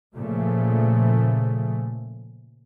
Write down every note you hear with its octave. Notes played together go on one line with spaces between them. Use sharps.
A#2 C#3 F3 A3